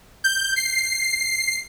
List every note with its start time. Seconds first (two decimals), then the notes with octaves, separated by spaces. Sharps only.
0.24 G6
0.56 C7